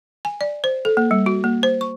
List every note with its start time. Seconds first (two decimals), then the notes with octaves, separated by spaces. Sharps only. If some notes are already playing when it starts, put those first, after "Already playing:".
0.25 G#5
0.41 D5
0.64 C5
0.85 A4
0.97 A#3
1.11 G3
1.26 F#4
1.44 A#3
1.63 C5
1.81 C#6